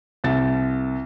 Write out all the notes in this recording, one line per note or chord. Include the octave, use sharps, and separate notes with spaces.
C2 E5 A6 E7